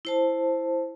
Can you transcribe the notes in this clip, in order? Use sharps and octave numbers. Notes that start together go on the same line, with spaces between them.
E4 C5 A5